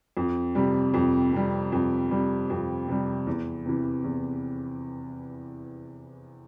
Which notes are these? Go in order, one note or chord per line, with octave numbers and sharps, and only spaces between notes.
F2
C3 G3
F2
C3 G3
F2
C3 G3
F2
C3 G3
E2
C3 E3
E2